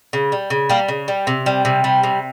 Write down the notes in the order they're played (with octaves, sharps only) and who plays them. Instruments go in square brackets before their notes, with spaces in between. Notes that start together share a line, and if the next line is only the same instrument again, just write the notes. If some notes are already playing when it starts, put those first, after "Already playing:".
[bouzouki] C#3
G3
C#3
G3 A#3
C#3
G3
C3
G3
C3
G3
C3